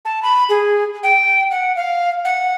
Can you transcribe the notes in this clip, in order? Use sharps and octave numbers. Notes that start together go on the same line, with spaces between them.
A5
B5
G#4
G5
F#5
F5
F#5